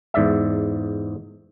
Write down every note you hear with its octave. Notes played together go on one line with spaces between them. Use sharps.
E2 G#2 D5 E5